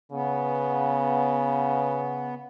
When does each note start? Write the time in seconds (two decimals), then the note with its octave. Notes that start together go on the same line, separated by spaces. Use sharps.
0.12 C#3 B3